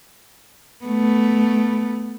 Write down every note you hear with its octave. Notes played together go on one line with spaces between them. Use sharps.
A3 B3